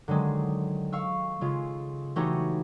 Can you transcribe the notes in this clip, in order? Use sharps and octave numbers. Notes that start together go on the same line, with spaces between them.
D3 D#3 F#3 G#3
F5 C#6 E6
C#3 G#3 F4
E3 A3 D#4 F#4 G4 C#5